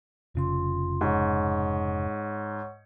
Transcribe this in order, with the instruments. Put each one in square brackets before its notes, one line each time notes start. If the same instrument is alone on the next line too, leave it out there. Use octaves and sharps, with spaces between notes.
[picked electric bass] F1 C#3 [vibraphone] F4 C6
[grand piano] G#2 [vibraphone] C#5 F#5 C#6